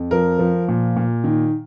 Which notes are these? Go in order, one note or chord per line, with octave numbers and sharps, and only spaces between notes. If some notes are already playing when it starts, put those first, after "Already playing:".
Already playing: F2
F3 A#4
F3
A#2
A#2
D#3